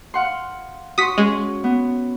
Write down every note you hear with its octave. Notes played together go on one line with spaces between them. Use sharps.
F5 F#5 C6
F#4 C6 D#6 B6
G#3 C#4
B3